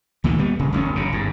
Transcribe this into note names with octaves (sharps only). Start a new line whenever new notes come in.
D2 A#2 D3 D#3
G3 B3
D#1 C#3
F#1 D2 C#4
F#1 F#2 C#3
G1 G#2